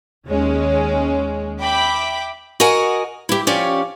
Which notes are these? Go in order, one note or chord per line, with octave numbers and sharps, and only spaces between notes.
D#2 G#3 C#4
E5 G5 B5 D6
F#4 A#4 D#5 F#5 G#5
E4 G4
F3 C#4 G4 C#5 D5